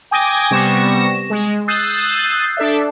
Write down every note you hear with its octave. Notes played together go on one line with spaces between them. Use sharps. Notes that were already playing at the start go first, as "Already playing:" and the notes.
G5 G#5 D6 D#6 G#6 A#6
C3 G3 B3 C#6 A#6 E7
G#3
D#6 E6 F#6 G6 A6 C7
D4 A4 D5 E5